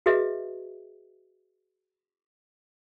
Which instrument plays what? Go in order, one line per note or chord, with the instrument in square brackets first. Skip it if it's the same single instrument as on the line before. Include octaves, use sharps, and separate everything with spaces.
[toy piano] F#4 G#4 B4 D#5 E5